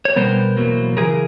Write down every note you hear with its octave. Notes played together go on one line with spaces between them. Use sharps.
C#5
B2 G3 B3 A#4 C5
E2 B2 F#3 A#3
C#3 E3 G#4 A#4